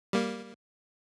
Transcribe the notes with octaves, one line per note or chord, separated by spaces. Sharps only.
G3 A#3